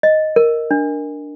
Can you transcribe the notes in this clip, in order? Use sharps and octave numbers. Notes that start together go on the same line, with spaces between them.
D#5
A#4
D4